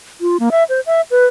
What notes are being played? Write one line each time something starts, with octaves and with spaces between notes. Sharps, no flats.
F4
A#3
E5
C5
E5
B4